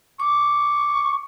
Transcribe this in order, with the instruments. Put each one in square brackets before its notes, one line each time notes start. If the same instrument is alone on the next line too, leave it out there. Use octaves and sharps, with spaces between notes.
[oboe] C#6 [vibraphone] D6